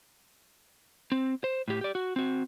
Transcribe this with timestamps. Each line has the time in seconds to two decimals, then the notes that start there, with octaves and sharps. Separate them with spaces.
1.12 C4
1.44 C5
1.68 A2 G4
1.81 G4 D5
1.95 F#4
2.16 C4 F#4